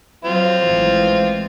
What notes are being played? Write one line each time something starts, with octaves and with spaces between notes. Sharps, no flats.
F#3 C4 F4
A1 E3 G#3